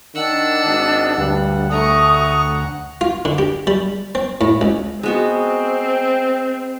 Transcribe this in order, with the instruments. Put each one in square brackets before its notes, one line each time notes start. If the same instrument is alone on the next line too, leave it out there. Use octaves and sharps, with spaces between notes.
[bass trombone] D#3 [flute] D4 [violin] F#5 E6
[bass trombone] G#1 [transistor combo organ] D#5
[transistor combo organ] D2 F#5 [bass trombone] G2
[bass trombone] A3 [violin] A#5 C#6 [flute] D#6
[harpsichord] F4
D3
G4
G3
C4
A2
C#2
[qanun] G#3 B3 F#4 [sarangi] C4